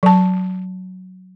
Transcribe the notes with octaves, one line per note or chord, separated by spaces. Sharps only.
F#3 A5